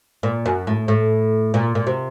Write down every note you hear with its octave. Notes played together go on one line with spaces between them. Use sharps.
A#2
F#2
A2
A2
A#2
A#2
C3